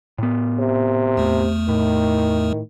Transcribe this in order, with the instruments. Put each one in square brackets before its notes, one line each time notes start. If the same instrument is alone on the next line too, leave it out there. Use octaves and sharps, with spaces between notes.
[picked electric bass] A2 B3
[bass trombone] C3
[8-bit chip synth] E2 A3
[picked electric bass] A2 [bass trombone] D#3